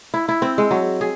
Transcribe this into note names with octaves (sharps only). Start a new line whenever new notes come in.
E4
E4
C4
G#3
F#3
G#4